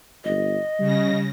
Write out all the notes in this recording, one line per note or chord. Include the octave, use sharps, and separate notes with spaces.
G1 D#5
C#3 G3 A#6